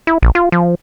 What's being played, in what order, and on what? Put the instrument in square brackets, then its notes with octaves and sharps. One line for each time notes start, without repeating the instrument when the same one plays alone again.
[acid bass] E4
A#1
F4
F3